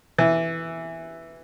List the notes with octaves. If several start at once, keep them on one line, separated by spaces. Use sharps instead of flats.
E3